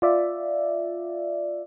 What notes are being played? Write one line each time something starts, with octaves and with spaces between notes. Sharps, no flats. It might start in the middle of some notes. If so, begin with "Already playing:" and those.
F4 D5 E5